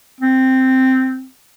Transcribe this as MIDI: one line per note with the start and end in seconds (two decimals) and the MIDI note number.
0.21 1.25 60